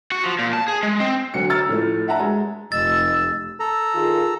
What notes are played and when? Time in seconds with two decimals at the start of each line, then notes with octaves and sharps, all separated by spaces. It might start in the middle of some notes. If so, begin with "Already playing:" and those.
0.12 F#4
0.24 F3
0.39 A#2
0.53 A5
0.68 G#4
0.83 G#3
1.00 C4
1.34 D2 F#3 F#4 C#7
1.50 A#5 E6 F6 A6
1.69 A2 F3 A3
2.08 E5 F#5 A5 A#5
2.20 G#3
2.72 F1 D#5 E6 A6
3.60 A4 A#5
3.95 D#3 F4 G#4